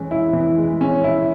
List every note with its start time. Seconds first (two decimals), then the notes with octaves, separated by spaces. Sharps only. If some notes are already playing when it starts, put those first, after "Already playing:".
Already playing: E3 G#3 C#4
0.11 E4
0.33 E3
0.57 G#3
0.81 C#4
1.04 E4